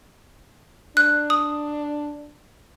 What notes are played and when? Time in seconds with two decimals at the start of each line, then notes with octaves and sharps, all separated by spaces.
0.97 D4 F#6
1.30 D#6